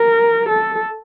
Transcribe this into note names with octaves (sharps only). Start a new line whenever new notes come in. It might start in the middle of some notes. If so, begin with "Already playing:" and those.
Already playing: A#4
A4